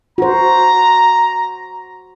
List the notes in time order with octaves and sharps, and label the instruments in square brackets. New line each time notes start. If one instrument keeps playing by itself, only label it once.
[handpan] F#4 C5 [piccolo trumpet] A#5